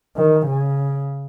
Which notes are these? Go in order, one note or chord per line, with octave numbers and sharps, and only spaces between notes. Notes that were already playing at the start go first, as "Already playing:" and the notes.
D#3
C#3